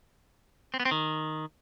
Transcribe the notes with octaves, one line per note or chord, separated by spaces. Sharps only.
C4
B3
C4
D#3